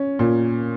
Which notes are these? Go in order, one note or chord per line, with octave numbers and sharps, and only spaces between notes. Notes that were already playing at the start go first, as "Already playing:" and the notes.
Already playing: C#4
A#2